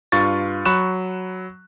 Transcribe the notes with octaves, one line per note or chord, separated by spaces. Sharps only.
G2 F4 C#6 A6
F#3 B5 C#6 F#6 E7